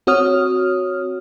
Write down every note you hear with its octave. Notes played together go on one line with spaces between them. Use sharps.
C4 F#4 C#5 D#6 F6